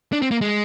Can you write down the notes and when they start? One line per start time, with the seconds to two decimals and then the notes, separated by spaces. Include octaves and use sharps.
0.13 D4
0.22 C4
0.31 A#3
0.41 G#3